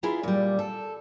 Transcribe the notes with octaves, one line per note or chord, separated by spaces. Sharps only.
B3 E4 F4 G#4 A#5
A#2 G3
A4